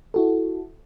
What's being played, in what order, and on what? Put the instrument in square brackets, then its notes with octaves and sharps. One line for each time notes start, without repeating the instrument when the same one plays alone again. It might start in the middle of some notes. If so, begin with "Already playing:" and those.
[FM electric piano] E4 F#4 A4